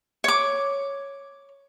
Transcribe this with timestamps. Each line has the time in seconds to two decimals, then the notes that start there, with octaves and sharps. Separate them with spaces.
0.24 C#5 D6